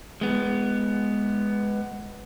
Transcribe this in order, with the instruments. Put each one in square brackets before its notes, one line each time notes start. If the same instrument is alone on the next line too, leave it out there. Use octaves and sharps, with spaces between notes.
[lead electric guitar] G#3 B3